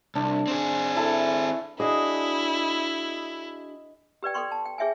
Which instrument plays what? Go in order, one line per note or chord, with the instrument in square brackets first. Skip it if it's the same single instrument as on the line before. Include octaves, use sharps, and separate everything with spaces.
[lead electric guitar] C2 [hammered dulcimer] D4
[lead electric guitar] C4 G#4
[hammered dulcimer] E4 A4
[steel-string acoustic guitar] D4 F#4 G#4 [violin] E4 [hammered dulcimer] D#5
[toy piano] G4 B4 D5 G5
A4 D5 G5 C6 C#6
A5
G5
G#4 C#5 E5 G5 G#5